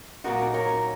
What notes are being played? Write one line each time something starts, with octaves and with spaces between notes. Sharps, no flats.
A#2 F#3 B3 D#4 F#4 A#4
A#4 C#5